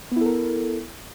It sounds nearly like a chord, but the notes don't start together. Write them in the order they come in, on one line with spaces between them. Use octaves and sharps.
B3 E4 A4 A#4